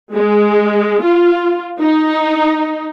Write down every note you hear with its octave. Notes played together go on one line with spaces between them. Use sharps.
G#3
F4
D#4